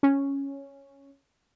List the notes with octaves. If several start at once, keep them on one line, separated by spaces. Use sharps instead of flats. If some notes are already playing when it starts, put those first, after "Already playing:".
C#4